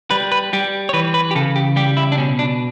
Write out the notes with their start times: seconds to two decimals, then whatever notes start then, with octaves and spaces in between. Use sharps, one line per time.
0.11 G3 B4
0.32 B4
0.53 G3 G4
0.89 C#5
0.93 E3 B4
1.14 B4
1.31 G4
1.35 C#3 A4
1.56 G4
1.76 G3 G4
1.97 E4
2.12 D4
2.18 B2 C#4
2.39 D4